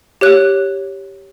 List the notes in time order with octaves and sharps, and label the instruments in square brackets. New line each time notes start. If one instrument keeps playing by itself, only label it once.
[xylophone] G4 C#5 F#6